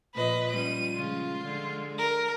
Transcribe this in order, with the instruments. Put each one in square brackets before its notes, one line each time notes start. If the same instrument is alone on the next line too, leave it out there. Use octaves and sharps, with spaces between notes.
[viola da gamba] A#2 F3 [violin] B4 D#5
[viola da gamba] G3 C#4 F4 [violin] D#7
[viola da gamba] C#3 F3 G#3 [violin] F4
[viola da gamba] D3 G#3
[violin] A#4